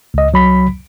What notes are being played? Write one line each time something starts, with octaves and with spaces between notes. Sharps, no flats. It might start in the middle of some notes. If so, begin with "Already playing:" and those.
C#2 D#5
C2 F#3 B5 B6